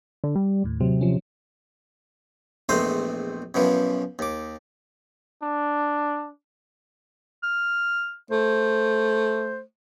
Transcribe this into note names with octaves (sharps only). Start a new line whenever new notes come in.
D3
G3
D#2 A2
C3 F#3
F3 C#4
A#1 E2 A3 C4 C5 D#5
F#2 B2 E3 F3
D#2 D6
D4
F6
A3 C5